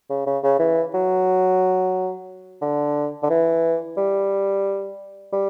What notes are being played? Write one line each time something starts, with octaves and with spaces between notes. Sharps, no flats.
C#3
C#3
C#3
E3
F#3
D3
D3
E3
G3
G3